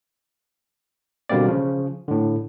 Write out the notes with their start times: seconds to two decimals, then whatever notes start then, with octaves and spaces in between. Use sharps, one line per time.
1.29 B2 D3 G3 A#3 C4 D5
1.48 C#3 F3
2.08 A2 D3